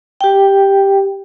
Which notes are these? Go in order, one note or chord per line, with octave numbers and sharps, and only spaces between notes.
G4 G5